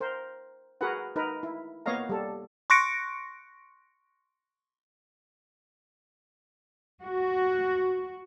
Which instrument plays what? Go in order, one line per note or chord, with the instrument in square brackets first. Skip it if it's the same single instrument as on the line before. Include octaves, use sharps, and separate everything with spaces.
[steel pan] A#4 C5
F#4 G#4 A#4 B4 F#5
D#4 A#4 B4
E4
A#3 B3 C#5 D#5 F5 A#5
G3 A4
[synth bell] C6 C#6 F#6 A#6 C#7 D7
[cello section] F#4